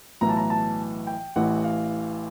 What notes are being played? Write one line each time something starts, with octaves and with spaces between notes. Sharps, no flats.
B1 A2 E3 A#5
A5
A#5
A5
G5
A1 A2 E3 F#5
F5